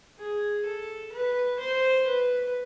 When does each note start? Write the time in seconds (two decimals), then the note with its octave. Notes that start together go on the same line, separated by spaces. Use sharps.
0.19 G#4
0.66 A4
1.13 B4
1.60 C5
2.07 B4